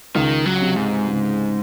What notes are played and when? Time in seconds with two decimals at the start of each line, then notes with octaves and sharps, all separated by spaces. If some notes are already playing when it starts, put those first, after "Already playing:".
0.15 C#2 D#3
0.46 F#3
0.62 C3
0.76 G#2
1.08 C#2